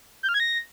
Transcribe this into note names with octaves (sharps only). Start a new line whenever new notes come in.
G6
F6
G#6
A#6